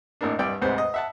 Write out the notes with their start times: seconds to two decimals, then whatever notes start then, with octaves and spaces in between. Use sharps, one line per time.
0.21 G#1 A2 A#3 D4
0.39 C2 G2 D5 G5
0.61 D2 G#2 C3 B4 C5
0.78 D#5
0.94 E5 F#5 A5